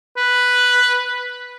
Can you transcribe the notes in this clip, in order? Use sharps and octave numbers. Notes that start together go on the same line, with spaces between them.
B4